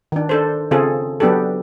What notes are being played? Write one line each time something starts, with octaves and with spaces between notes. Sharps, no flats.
D#3 D4
D4 A4 C5
C#3 C4 F4 G#4 A4
F#3 B3 D4 G4 A4